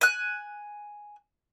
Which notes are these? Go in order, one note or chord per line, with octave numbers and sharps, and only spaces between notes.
G#5 F#6